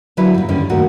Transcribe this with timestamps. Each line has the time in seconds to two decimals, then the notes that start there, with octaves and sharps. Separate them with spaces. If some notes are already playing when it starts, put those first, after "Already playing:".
0.17 D3 F#3 D4 E4 B4
0.34 G2 A#2
0.49 G2 D3 D#3 C#4
0.70 D#2 A#2 D#3 A3 D4 F#4